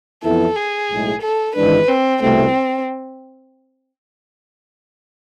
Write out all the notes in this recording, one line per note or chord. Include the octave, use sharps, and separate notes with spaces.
F2 E3 B3 E4 A4
G#4
B1 A2 G#3
A4
G#1 G#2 E3 G#3 D4 B4
C4
C2 B2 A3 C4